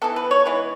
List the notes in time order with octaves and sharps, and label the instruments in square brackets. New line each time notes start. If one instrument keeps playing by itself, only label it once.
[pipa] E3 B3 A4
B4
C#5
E3 G#3 B3 B4